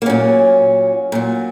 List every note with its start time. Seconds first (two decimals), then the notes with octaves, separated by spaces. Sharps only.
0.02 A#3
0.06 A#2 F#3 C#4
1.12 A#2 F#3